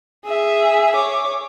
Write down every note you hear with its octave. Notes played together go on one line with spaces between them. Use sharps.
G#4 E5
C#5 D6